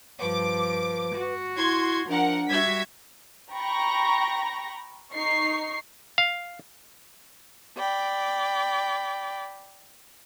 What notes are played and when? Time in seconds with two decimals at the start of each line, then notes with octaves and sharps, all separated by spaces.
0.21 G2 F3 B4 D6
1.15 F#4
1.57 E4 C6 G#6
2.09 F3 D4 A#4 F#5
2.49 G3 F#4 E5 G#6 B6
3.52 G5 A#5 B5 C#6 A#6
5.12 D#4 C#6 C7
6.18 F5
7.78 D5 G5 B5